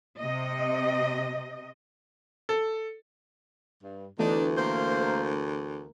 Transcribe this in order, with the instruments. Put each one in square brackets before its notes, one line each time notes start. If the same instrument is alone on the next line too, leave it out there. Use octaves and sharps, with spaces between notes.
[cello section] C3 D#5
[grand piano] A4
[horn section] G2
[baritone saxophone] D2 [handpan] E3 A3 B3 [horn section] D4 D#4
[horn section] A#3 C5
[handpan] A#4